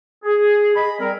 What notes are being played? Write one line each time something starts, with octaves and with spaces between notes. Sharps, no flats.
G#4
D#5 G#5 B5
G3 C4 A#4